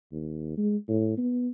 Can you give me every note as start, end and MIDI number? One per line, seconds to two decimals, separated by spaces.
0.12 0.54 39
0.58 0.76 56
0.88 1.17 45
1.18 1.50 59